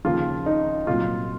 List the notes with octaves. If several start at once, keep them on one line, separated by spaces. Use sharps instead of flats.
D#2 C#3 F3 F4
D#4
C2 A#2 F#3 F4